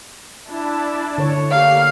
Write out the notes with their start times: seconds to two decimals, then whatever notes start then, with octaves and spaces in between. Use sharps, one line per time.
0.48 D4 E4 A5
1.18 D3 C#5
1.51 A#3 G4 F5